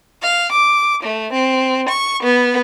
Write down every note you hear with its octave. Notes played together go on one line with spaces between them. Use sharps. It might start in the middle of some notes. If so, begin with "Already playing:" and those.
F5
D6
A3
C4
C#6
B3